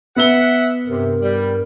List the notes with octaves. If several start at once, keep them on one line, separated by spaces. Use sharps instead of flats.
B3 E5 F#5 G7
G2 C3 A#4
G3